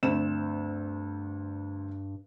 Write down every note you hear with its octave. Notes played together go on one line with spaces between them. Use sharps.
D2 G2 C4 E7